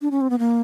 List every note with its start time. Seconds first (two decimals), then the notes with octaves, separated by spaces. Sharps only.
0.02 D4
0.11 C#4
0.21 C4
0.30 B3
0.39 A#3